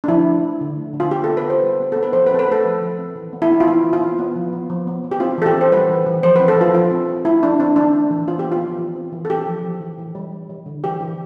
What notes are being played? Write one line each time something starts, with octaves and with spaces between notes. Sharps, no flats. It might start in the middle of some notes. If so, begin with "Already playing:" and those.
D4
F3 E4
A3
F3
D3
A3
D3
F4
B3 G4
B3 A4
B4
B3 C5
G3
B3
B3 A4
B4
F3 C5
B4
C4 A4
B4
A3 A4
F3
F3
C4
E3
B3
E4
B3
F4
E3 E4
E3
F4
B3
B3
F3
B3
F3
B3
B3
G4
C4 F4
E3 A4
G4
C4
C5
G3 B4
E3
E3
F3 C5
C4 B4
A4
F3 F4
F3 F4
C4
C4
C4 E4
F3 D4
C4 D4
E3 D4
A3
E3
B3 F4
G4
B3
F4
F3
E3
C4
E3
A4
C4 G4
F3
F3
E3
E3
G3
G3
G3
D3
E3 G4
E3